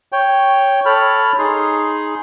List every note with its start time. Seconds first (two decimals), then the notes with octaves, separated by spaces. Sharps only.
0.12 C#5 G5
0.86 A4 C#5 B5 F6
1.38 D#4 G#4 C6